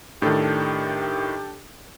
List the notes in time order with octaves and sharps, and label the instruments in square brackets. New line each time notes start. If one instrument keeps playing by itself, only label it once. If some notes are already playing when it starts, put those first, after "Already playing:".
[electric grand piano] A2 D#3 [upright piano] D4 A4 [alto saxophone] G4